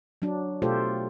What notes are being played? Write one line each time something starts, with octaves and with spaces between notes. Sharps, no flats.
F#3 D4
B2 A3 F4 G4 A4 C5